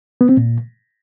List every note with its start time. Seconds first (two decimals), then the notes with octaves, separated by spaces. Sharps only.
0.21 B3
0.29 C4
0.37 A#2